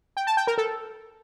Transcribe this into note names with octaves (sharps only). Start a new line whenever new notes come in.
G5
A5
G5
A#4
A4